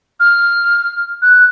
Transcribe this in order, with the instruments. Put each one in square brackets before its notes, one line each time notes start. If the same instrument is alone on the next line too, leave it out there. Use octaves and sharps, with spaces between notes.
[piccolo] F6
F#6